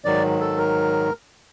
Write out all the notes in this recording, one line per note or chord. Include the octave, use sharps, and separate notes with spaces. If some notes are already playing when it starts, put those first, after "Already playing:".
G#2 D#3 F#3 D5
A4
A#4